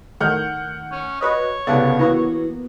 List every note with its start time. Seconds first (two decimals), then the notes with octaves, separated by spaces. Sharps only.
0.20 A2 D#3 F#5 F6 G6
0.92 C#4
1.21 F#4 B4 C#5 D#5
1.67 C2 C#3 B3 A4 D5 F#5
1.99 E3 A#3 B3 F#4